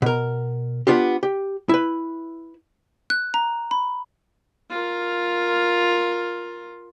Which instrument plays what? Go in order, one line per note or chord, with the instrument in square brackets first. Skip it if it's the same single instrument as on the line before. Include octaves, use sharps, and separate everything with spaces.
[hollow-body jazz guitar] B2 A#4
B3 D4 F4 G4
G4
E4 B4
[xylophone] F#6
A#5
B5
[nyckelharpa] F4 A#4